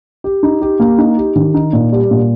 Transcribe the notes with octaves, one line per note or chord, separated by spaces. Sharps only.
G4
D#4
G4
A#3
D#4
G4
D#3
D#4
A#2
G3
A#2